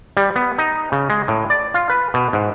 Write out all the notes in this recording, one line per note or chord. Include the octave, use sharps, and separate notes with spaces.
G3
B3
D#4
C#3
G#3
A2
D5
F4
B4
B2
G#2